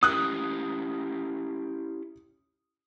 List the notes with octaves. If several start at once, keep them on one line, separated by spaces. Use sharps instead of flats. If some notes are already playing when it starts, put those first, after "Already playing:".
C#4 E4 G4 D#6 F#6